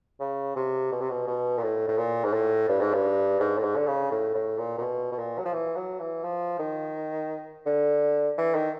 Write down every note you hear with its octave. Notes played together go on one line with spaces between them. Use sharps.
C#3
C3
B2
C3
B2
B2
A#2
A2
A2
A#2
G#2
A2
G2
G#2
G2
G#2
A2
G#2
D3
C#3
A2
A2
A#2
A#2
B2
B2
A#2
F#3
F3
E3
F#3
E3
F3
D#3
D3
E3
D#3